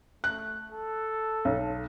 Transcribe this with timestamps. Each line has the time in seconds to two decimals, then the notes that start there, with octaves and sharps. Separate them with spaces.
0.24 A3 F#6
0.72 A4
1.45 B1